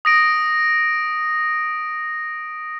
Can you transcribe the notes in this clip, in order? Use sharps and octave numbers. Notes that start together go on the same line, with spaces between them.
D#6 A#6 D7